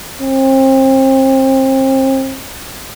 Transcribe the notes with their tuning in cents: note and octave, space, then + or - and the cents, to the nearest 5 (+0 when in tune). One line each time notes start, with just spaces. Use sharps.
C4 +30